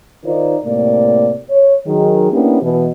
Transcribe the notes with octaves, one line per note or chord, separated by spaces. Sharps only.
D#3 D#4 F4 A#4 C5 D5
A2 C3 A#3 D5
C#5
D#3 F#3 G#4
A#3 B3 C#4 D4 E4 G4
B2 E3